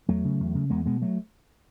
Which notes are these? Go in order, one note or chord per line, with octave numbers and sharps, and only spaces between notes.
E2 F#3 A3
C#3
E2
C#3
E2 G#3 B3
B2 G#3 B3
F#3 A3